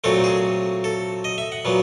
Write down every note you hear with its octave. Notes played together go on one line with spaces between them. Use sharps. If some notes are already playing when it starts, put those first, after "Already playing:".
A#2 F#3 A3 C4 A4
G#4
A4
D#5
E5
F#5
A#2 F#3 B3